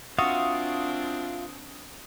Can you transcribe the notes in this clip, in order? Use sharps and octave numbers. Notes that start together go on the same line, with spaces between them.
C4 D4 F4 F#4 E5 F5 D#6